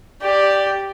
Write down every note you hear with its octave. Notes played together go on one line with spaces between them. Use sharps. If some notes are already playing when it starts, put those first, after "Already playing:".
G4 D5